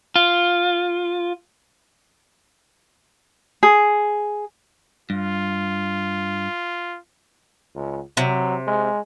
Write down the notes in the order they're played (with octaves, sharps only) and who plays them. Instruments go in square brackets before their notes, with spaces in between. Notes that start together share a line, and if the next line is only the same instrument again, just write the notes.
[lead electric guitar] F4
[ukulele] G#4
[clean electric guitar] G2 [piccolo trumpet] F4
[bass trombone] C#2
[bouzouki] C3 [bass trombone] F#3
[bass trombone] G#3